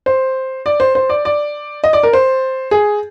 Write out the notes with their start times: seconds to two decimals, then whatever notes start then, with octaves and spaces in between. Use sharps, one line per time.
0.06 C5
0.66 D5
0.80 C5
0.95 C5
1.10 D5
1.25 D5
1.84 D#5
1.93 D5
2.03 A#4
2.13 C5
2.71 G#4